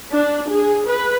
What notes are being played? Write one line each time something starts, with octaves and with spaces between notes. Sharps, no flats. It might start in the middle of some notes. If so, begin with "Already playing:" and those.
D4
G#4
B4